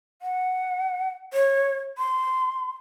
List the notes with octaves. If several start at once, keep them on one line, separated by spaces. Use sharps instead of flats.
F#5
C#5
C6